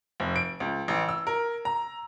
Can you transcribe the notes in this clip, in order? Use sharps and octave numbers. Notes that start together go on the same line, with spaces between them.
F1
D7
C#2
A1
E6
A#4
A#5